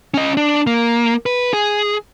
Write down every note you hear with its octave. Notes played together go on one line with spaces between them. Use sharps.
C#4 D#5
D4
A#3
B4
G#4